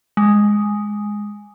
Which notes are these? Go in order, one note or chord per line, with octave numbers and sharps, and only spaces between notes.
G#3